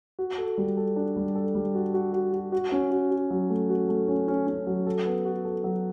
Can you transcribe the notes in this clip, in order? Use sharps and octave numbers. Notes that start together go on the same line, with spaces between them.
F#4
A4
G3
A4
D4
G3
A4
G3
F#4
F#4
F#4
F#4
F#4
C#4
F#4
F#4
F#3
A3
F#4
A3
C#4
C#4
C#4
F#3
A4
B3
F#4
A4
F#3